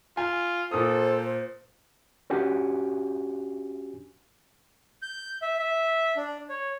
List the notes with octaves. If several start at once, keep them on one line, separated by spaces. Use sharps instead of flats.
F4 G#5
A#2 A4 C5 D#6
C#4 D4 F#4 G4 G#5
G6
E5
E5
D4
C#5